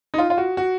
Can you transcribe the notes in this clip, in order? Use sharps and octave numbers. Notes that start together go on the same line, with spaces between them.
D#4
F4
F4
F#4
F#4